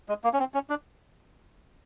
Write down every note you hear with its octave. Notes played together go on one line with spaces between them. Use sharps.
G#3
A#3
C#4
C4
C#4
D4